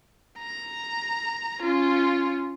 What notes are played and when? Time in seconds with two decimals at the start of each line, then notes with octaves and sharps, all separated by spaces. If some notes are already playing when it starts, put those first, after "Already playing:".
0.39 A#5
1.62 C#4 F4